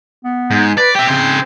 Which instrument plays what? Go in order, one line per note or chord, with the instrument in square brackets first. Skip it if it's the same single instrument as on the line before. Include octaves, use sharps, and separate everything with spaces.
[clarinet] B3
[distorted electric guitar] G#2
[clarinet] B4 [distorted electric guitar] D5
[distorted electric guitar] G4 E5 [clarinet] G5
[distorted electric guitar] C#3 C5 [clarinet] C4